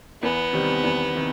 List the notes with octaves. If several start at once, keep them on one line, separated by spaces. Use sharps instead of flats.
E2 B3
C3 D#3 G3 C4
E2
C3 D#3